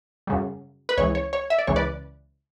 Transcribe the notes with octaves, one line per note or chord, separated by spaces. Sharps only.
F#2 C#3 G3
B4
C#2 C#3 E3 C#5
C#5
C#5
E5
D5
C#2 C#3 E3 C#5
B4 D5